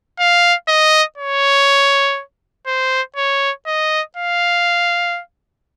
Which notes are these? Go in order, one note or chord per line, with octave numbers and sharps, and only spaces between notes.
F5
D#5
C#5
C5
C#5
D#5
F5